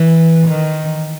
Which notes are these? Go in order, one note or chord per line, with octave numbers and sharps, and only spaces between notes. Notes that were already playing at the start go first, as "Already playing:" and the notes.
Already playing: E3
D#3